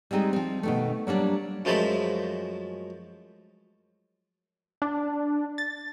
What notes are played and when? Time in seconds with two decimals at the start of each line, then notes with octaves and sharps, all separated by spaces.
0.11 G3 G#3 C4 D#4 G#4
0.33 F3 C4
0.63 B2 D#3 A3
1.07 F#3 G3 A#3 D4
1.65 F#2 F3 G#3 A3 B5
4.82 D4
5.58 A6